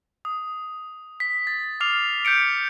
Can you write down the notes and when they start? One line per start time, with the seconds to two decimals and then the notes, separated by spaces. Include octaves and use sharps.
0.25 D#6
1.20 B6
1.47 A6
1.80 D6 F6 C7 F7
2.25 G6 B6 C#7 D7